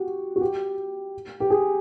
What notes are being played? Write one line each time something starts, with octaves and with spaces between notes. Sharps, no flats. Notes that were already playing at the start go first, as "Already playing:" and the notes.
Already playing: F#4 G4
F#4
G4
G4
G#4